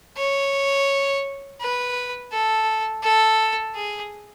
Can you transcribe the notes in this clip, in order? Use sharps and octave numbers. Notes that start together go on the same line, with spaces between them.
C#5
B4
A4
A4
G#4